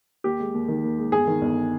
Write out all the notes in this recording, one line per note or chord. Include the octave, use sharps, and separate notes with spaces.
D#2 G4
G#3
D#2
D#3
D#2
G#3
G1 G#4
D#3
G1